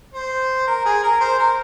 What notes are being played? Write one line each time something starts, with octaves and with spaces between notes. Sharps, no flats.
C5
A#4
G#4
A#4
C5
A#4